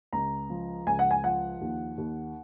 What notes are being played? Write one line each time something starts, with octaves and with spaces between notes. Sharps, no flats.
C#2 A#5
F3
C#2 G#5
F#5
G#5
F3 F#5
D#2
D#2